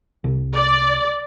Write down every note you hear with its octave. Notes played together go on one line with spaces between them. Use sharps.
C2
D5